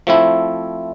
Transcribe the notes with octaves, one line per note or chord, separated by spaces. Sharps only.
F3 A3 C4 E4